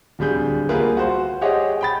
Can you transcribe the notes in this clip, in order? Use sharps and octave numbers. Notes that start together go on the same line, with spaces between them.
D1 D3 G3 G#4 G6
G3 A#3 B3 F4 G#4 B4
F#4 C5
G4 G#4 C5 C#5 D#5 F#5
G5 B5 A6